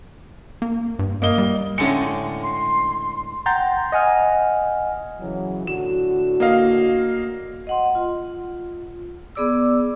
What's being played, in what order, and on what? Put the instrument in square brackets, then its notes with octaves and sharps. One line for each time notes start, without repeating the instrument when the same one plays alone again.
[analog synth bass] A#3
G2
[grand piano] A#3 D#5 G7
[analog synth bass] G3
[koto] A2 D3 G#3 [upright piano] C#4 C#7
[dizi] C6
[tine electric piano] F#5 G5 A#5 C6 G6 A6
D#5 F#5 G#5 F6
[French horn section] C#3 E3 F#3
[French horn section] A2 D3 F#4 [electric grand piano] E7
[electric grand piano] A#3 D#5 F5
[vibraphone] D#5 F#5 C6
F4
B3 G#4 D5 D6 E6